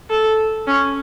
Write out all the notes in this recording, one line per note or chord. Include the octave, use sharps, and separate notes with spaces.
A4
C#4